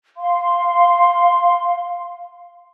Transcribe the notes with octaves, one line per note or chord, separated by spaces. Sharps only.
F5 C6